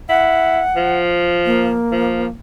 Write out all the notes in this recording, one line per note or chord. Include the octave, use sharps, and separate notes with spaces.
E4 F#5
F3
A#3
F3